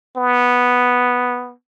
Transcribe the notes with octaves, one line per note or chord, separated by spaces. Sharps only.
B3